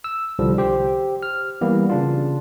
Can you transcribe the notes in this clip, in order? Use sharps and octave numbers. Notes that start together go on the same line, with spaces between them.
E6
C2 D3 F3 G3
G4 C5
F6
E3 G3 A#3 B3
C#3 D4 F4